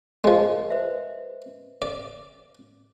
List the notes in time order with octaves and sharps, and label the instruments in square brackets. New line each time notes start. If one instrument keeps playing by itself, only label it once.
[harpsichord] F3 G#3 [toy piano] A#4 D#5
[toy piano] B4 C5 E5
[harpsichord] D5